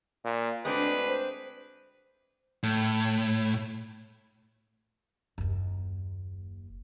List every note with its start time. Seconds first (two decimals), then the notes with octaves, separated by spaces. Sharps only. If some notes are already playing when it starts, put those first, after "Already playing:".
0.24 A#2
0.65 D2 G#3 C4 D4 B4
1.08 C5
2.63 A2
5.38 F#1 D#2